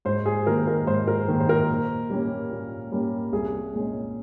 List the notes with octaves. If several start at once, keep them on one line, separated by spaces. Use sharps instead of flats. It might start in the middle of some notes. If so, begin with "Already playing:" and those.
G#2 C5
G#4
D#3 A#3 A#4
A#4
G#2 C5
A#4
D#3 A#3
C5
A#4
A#2
G3 A#3 C#4
A#2
G3 A#3 C#4
C2 G#4
A#2 G#3 C#4